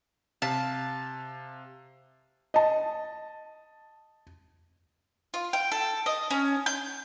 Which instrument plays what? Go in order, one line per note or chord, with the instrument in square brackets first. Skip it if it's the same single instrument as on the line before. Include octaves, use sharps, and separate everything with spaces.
[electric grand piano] C3 F5 B6 [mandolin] A5
[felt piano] D#5 A5
[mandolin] F4
G5
A4
D#5
C#4
G6